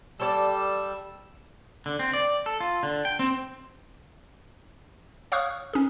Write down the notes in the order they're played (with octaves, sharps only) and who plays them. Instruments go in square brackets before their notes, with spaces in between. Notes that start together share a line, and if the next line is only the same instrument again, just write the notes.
[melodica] G3 E6 [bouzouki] A4 C#5 D5
[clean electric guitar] D3
C4
D5
A4
F4
D3
G5
C4
[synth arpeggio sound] C#5 F5 C#6 D#6 F6 F#6
C#4 G#4